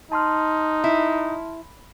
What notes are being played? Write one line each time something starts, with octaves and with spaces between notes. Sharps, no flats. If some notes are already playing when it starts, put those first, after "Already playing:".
D#4 A5 C6 F6
E4